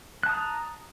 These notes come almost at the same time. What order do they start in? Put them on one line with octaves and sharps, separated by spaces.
F#6 A5 D#6 A#5